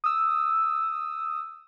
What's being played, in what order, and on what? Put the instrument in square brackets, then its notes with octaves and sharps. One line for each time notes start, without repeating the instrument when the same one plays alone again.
[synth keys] D#6 E6